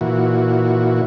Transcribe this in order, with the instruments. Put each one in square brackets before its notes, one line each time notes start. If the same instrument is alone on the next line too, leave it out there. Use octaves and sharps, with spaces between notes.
[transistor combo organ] A#2 E3 F#4